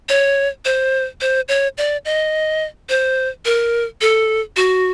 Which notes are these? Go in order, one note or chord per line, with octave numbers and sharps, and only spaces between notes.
C#5
C5
C5
C#5
D5
D#5
C5
A#4
A4
F#4